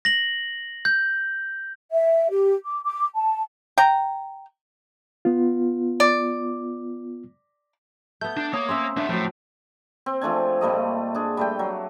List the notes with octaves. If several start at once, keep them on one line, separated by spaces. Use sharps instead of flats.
A#6 F#7
G6
E5
G4
D6
D6
A5
G5 A#5
B3 F4
D5
A3 B3 G6
D4
A#3 C#5 D#6
C4 C#4 E5 C6 E6
A#3 B3 D4 E5
A2 F3 F#3 C4
C4
F3 A3 D4 G#5
A#2 G3 A3 D#5
D4 G#4
G3 A3 G5
F#3